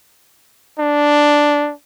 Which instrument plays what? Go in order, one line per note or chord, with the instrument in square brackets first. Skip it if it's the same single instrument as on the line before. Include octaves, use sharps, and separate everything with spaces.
[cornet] D4